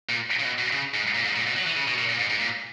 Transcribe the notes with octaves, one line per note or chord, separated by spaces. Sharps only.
A#2
C#3
B2
B2
C#3
G#2
A#2
G#2
A#2
B2
F#3
E3
C#3
B2
A#2
A#2
G#2
G#2
A#2